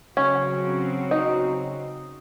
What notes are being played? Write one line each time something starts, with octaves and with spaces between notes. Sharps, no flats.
C#3 F#3 C4 C#4 F#4
D#4